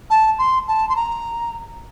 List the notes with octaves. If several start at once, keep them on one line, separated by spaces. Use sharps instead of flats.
A5
C6
A5
C6
A#5